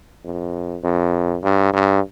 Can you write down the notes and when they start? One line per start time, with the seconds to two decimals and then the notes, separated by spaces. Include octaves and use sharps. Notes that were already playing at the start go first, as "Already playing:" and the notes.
0.24 F2
0.84 F2
1.43 G2
1.73 G2